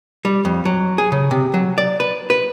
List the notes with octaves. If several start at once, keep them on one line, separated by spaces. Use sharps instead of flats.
G3
F2
F#3
G#4
C#3
C3
F#3
D5
B4
B4